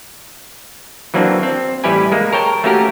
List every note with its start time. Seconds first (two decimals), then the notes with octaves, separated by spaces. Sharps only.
1.14 E3 F#3 A#3 C4 D4
1.43 C4
1.84 A1 G3 E4 G4 B4 G#5
2.12 G#3 A#3
2.32 A#4 C#5 G5 A5
2.64 A3 A#3 C#4 F#4 G4 A#4